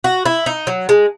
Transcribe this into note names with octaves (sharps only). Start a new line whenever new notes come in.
F#4
E4
D#4
F#3
G#3